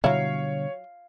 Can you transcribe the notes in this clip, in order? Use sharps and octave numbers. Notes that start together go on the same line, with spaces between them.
B2 D3 F#3 G3 E4 C#5 F5